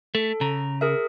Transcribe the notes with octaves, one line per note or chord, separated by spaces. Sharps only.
A3 A4
C#3 A#5
G#4 A#4 E5